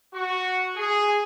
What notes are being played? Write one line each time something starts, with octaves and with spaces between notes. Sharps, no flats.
F#4 C#6
G#4